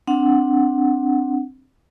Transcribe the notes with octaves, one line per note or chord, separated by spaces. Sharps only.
C4 D4 F#5